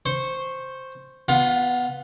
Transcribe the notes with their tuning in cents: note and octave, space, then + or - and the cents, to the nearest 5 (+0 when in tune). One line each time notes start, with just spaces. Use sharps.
C5 +0 C#6 -15
B3 +0 F4 +0 F5 +30